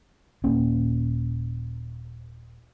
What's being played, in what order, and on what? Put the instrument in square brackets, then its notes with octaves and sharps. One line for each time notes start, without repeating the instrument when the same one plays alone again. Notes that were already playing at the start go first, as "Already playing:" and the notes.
[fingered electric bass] D#1 A#3 C#4